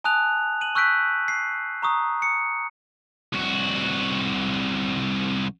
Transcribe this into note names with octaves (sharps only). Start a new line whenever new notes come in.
G#5 A5 D#6 F#6 F7
D#7 F#7
C#6 E6 F#6 G6 B6 D7
C7
A#5 C#6 D#6
D#6 C#7
C2 F#4